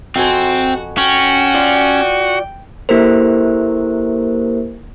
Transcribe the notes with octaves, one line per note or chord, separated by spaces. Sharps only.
F2 C4 F#4 G#5
C#4 F#4 G5
F4 D5 F5
A#3 E4 G4 A4 A#4 C5